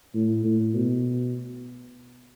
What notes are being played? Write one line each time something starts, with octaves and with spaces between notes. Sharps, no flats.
A2
A2
B2